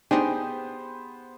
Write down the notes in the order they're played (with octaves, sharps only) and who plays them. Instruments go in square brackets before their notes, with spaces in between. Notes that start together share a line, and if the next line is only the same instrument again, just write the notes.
[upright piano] B3 C5 [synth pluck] D4 D#4 [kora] G4 G#4